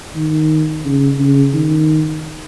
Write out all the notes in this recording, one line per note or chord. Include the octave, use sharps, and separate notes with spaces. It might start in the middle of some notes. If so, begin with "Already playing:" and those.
D#3
C#3
C#3
D#3